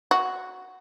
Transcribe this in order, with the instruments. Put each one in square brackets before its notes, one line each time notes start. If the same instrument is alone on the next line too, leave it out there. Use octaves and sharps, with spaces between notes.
[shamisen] F#4